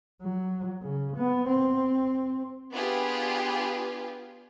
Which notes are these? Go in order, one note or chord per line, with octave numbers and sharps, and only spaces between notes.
F#3
C#3
B3
C4
B3 D4 F4 G4 G#4 B4